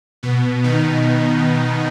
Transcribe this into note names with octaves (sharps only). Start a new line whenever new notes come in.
B2 B3
D#3 D#4